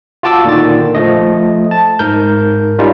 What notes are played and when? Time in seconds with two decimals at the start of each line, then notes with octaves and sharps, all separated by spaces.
0.23 F4 F#4 A5 D6 E6
0.45 A#2 D3 D#3 A6
0.95 F3 A3 D#5
1.71 A5
1.99 G#2 A#4 G6
2.79 G3 C#4 D#4 F4